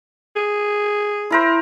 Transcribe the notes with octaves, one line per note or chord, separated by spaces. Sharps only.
G#4
E4 A#4 C5